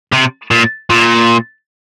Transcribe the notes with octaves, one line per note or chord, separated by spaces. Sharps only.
C3
A#2
A#2